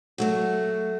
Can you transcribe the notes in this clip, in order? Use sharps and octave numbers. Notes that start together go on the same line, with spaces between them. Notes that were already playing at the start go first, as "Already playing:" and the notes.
F#3 A3 F#4